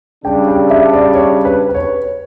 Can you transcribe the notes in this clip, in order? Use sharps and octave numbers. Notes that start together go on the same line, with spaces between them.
C#3 G3 D4 G5
G5
E5
D5
C#5
B4
B4
C#5